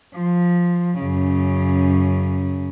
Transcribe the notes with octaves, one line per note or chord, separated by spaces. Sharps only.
F3
F#2 C#3